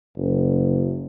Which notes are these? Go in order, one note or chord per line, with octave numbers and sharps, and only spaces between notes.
F#1